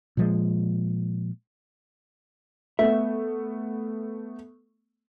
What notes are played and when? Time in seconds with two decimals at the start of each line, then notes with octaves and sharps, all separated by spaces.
0.17 A#2 F3 G#3
2.79 A3 B3 E5